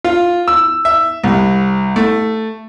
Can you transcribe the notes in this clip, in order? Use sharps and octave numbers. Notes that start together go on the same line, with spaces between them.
F4
E6
E5
C2
A3